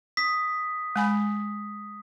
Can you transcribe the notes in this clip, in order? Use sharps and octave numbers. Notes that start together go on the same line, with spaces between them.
D#6 B6
G#3 G#5 B5